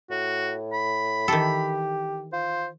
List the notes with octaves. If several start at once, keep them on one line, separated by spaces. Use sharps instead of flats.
A2 F#4
B5
D#3 E3 G4 A4
F4 C5